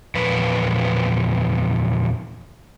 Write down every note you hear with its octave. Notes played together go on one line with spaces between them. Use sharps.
E2 A#2 F3 B4